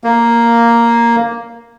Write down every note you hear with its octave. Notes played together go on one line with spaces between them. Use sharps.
A#3